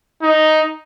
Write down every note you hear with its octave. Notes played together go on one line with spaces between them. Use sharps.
D#4